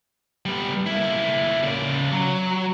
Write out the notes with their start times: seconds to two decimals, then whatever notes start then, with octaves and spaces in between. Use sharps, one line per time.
0.46 G3 B3
0.86 A#3 E4
1.63 C#3 D5
2.12 F#3